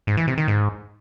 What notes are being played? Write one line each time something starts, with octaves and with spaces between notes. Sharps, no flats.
G#2
E3
C3
D#3
G#2